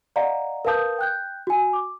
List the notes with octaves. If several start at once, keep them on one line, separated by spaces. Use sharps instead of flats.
D5 D#5 F5 F#5 A#5
A#4 B4 F5 A5 D#6 G6
G5 F#6 G6
F#4 G#5
D6